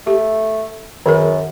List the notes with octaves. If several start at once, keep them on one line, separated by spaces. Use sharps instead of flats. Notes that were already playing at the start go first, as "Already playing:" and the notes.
A3 G4
F#2 D#3 G#4 A#4